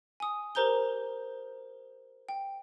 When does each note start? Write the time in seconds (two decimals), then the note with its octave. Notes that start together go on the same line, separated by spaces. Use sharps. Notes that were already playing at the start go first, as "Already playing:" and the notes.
0.20 G#5 D#6
0.55 G4 A#4 C5 A#5 G6 G7
2.29 G5